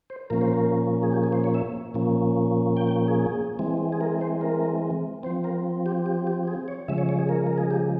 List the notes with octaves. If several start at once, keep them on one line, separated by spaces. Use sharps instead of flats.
C5
A#2 F3 A#3 C#4 A#4
C5
A#4
G#4
G4
G#4
C5
C#5
E5
A#2 F3 A#3 C#4
G5
G5
G#4
E3 G#3 C4
G#4
A#4
C5
A#4
F3 C4 C5
A#4
G4
G4
G4
G#4
C#5
C#3 F3 G#3 E5
C#5
C#5
G#4
A#4
A#4
G#4
G4